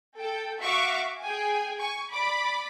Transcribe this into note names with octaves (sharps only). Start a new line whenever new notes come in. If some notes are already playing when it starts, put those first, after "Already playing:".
A4 G5
F#4 E5 F5 C#6 D6
G#4 G5 G#5
G#5 C#6
D5 B5 D6